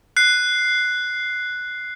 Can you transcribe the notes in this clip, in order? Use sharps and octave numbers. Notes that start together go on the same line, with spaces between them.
F#6 C7